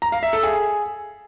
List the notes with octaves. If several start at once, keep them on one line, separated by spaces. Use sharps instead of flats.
A#5
F5
E5
A4
G#4